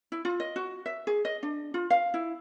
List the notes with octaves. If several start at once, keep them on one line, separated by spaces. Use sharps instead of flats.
E4
F4
D#5
F#4
E5
G#4
D#5
D4
F4
F5
E4